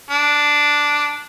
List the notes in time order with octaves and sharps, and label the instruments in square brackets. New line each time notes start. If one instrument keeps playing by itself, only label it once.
[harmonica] D4